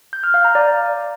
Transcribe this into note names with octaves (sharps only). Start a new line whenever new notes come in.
G6
F6
F5
A#5
D5